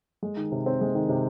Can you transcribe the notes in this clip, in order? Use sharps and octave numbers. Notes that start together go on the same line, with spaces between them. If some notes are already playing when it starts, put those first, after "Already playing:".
G#3
D#3
C3
C4
G#3
D#3
C3